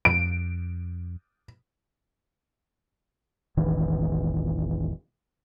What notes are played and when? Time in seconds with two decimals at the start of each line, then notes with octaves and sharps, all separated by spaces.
0.05 F2 D7
3.57 E1 A1 D#3 E3